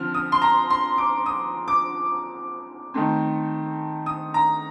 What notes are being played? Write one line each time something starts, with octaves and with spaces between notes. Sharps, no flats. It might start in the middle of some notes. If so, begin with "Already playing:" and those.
Already playing: D3 F3 C4 F6
D#6
C6
A#5
C6
D6
D#6
D6
D#3 A3 C4
D#6
A#5